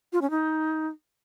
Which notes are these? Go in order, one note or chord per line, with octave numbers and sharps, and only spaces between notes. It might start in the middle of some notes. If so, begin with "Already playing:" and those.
F4
C#4
D#4